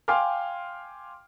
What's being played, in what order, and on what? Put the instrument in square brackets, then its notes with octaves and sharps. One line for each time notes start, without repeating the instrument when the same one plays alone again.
[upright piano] F5 G5 G#5 C6 D6 F6